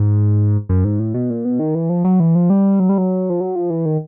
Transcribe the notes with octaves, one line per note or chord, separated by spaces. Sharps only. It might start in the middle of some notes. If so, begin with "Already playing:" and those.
Already playing: G#2
F#2
G#2
A2
B2
A#2
B2
D#3
E3
F3
F#3
E3
F3
G3
F#3
G3
F#3
F3
F#3
F3
E3
D#3